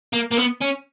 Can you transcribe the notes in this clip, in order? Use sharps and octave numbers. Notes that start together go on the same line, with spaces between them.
A#3
A#3
B3
C#4